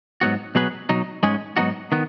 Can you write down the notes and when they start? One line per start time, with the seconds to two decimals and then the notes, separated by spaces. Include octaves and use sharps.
0.21 G#2 F#3 B3 F#4
0.55 B2 F#3 B3 G#4 B4
0.89 B2 F#3 D#4
1.23 G#2 G#3 C#4 G#4
1.57 G#2 F#3 B3 D#4 F#4
1.92 D#3 B3